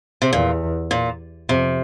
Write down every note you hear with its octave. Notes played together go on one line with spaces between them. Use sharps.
C3
E2 A#2
A#2
F2 C3